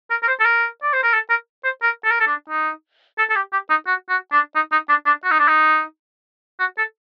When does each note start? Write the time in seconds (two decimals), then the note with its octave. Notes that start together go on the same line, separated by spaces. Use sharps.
0.11 A#4
0.23 A#4
0.28 C5
0.40 A4
0.45 A#4
0.83 D5
0.93 C5
1.03 A#4
1.14 A4
1.30 A#4
1.64 C5
1.82 A#4
2.04 A4
2.11 A#4
2.20 A4
2.27 D4
2.49 D#4
3.18 A4
3.30 A4
3.36 G4
3.53 G4
3.70 D#4
3.87 F#4
4.09 F#4
4.32 D4
4.55 D#4
4.72 D#4
4.89 D4
5.06 D4
5.24 F#4
5.31 D#4
5.39 D4
5.48 D#4
6.60 F#4
6.78 A4